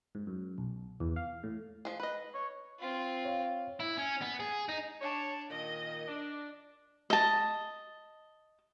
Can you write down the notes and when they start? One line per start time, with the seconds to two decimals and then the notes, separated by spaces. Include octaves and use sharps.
0.15 G#2
0.27 F#2
0.58 B1
1.00 E2
1.16 F5
1.43 A2
1.85 F3 G#4
2.00 B4 D#5
2.34 C#5
2.79 C4 F4
3.25 C#5 F5
3.80 E4
3.98 C#4
4.22 B3
4.40 G#4
4.69 D#4
5.01 D4 C#5 A5
5.50 A#2 D#3 D#5
6.07 D4
7.10 D#5 A5